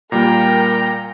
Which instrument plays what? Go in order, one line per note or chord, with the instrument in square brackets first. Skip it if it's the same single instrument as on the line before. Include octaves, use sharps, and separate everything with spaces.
[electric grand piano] A#2 G3 A#3 [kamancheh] A#4 G5 [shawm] A#5